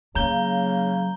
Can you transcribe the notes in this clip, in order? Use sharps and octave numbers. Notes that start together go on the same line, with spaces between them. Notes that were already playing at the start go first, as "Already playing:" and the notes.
C#3 F#3 A#3 C#4 A#5 G6 G7